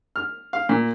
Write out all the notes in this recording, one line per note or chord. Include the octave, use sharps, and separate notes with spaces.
F6
F5
A#2